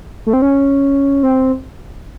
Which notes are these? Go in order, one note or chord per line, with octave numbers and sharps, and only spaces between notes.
A3
C4
C#4
C4